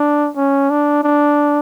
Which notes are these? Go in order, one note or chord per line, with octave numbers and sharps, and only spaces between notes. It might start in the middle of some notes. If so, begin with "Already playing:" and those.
Already playing: D4
C#4
D4
D4